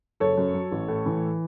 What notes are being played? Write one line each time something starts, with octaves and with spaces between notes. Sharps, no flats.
F#1 A4 C#5
F#2
F#3
A1
A2
E3